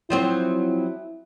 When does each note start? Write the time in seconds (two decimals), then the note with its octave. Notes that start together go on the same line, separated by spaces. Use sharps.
0.10 F3 F#3 C4 E4